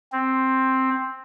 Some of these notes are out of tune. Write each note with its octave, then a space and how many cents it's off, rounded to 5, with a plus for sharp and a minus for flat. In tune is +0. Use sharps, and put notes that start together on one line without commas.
C4 +5